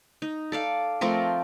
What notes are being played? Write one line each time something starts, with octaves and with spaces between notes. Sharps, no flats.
D#4
A4 D5 F5
F3 A3 C4 A#4